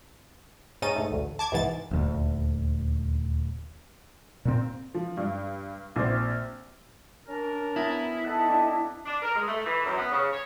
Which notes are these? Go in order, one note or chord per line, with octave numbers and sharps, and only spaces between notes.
G#2 C#4 D#4 A6 D#7
G#2 A3
A1 D2
A5 D6 G#6
C2 G#2 B2 E3 A6
D#1 D2
A#2 C4
F3
G2
A#1 C4
C#4 D4 A#4
B3 E4 G#5 A#5
D#4 A4 D#5 F#5 A5
C4 D4
D4
A#4
G#3
A3
E3
F#2
B3
C#3
C#5